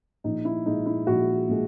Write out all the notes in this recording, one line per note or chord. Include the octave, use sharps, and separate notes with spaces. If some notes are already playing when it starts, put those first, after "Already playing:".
A#1 D#4
E4
A#2 G#3 D#4
E4
A#1 F#4
A#2 G#3